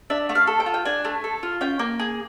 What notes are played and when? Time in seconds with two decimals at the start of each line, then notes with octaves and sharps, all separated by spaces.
0.10 D4 E5
0.29 A3
0.35 F5
0.47 A4
0.60 G5
0.66 F4
0.74 G5
0.85 D4 G#5
1.05 A3
1.24 A4
1.43 F4
1.61 C#4 G5
1.79 A#3
1.99 G#4